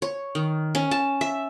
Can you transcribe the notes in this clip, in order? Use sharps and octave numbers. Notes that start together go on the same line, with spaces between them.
C#5
D#3
C#4
A5
E5